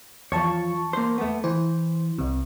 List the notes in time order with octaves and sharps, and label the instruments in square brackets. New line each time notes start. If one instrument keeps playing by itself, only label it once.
[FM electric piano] E2 A5 C#6 [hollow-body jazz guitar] F3 C#5
[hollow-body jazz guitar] A#3 C5
A3 B3
[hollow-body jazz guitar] E3 [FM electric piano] C5
[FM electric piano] C2 C3